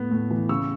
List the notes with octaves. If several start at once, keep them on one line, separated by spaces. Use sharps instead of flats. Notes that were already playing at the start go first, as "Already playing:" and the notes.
Already playing: A2 B3
A2
E3
C#3 C#6 E6